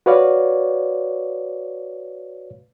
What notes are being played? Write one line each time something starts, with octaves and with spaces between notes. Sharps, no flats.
F#4 B4 C#5 D5 F5